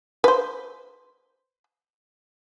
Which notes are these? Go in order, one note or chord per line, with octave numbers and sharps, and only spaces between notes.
B4 C5